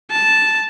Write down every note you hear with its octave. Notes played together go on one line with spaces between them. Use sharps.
A5